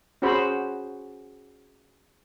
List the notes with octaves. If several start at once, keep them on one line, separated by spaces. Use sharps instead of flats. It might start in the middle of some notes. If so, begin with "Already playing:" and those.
C#4 F#4 G#4 C5 B5